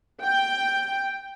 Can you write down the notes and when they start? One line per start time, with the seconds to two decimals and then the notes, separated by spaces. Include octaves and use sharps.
0.22 G5